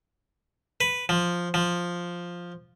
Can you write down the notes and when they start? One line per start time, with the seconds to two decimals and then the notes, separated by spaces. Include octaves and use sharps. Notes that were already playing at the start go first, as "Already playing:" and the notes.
0.81 B4
1.09 F3
1.54 F3